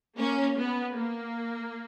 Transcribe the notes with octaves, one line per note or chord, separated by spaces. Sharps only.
A#3 C#4
B3
A#3